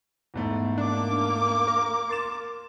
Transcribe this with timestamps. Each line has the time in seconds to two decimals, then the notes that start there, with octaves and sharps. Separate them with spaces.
0.34 E2 G#2 A3
0.78 A#3 D4 D6
1.68 A#4
2.09 C6 A6 E7